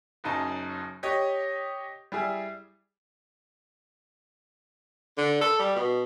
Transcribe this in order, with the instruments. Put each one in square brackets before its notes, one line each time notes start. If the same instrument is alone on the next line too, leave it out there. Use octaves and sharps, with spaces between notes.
[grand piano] F#1 F#2 D#4 A5
G4 C#5 D#5
G3 E4 G#4
[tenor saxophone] D3
A4
G3
B2